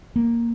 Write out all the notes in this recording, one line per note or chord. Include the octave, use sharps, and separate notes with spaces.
A#3